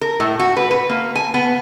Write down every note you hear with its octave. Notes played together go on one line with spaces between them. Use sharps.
A#4
A2
F#4
B4
B4
A#3
G#5
B3